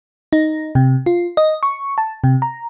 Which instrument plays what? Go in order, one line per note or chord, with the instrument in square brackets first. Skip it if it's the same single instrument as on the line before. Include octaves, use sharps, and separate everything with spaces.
[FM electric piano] D#4
C3
F4
D#5
C#6
A5
C3
A#5